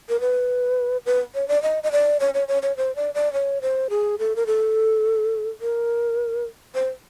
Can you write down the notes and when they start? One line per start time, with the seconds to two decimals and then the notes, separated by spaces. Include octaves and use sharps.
0.09 A#4
0.20 B4
1.06 B4
1.35 C#5
1.48 D5
1.63 D#5
1.83 D#5
1.92 D5
2.20 C#5
2.34 C#5
2.48 C#5
2.63 C#5
2.77 C5
2.96 D5
3.15 D5
3.33 C#5
3.62 C5
3.90 G#4
4.19 A4
4.36 A#4
4.47 A4
5.61 A#4
6.75 C5